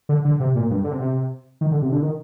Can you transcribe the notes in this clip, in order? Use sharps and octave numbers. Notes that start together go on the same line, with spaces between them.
D3
D3
C3
A#2
G2
D3
C3
C3
D#3
D3
C3
D3
D#3